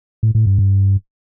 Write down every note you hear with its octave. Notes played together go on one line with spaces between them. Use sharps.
A2
A2
G2
G2